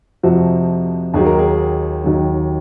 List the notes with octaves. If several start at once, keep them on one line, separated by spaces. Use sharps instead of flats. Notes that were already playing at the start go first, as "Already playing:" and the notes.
F2 C3 F3 F#4
D#2 D#3 F#3 G#4
A#4
G#4
D#2 D#3 F#3